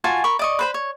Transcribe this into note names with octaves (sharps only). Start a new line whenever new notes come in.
F4 F#4 G#5 A5
A#4 B5 C#6
D5 D#5 C#6
B4 C5 B5
C#5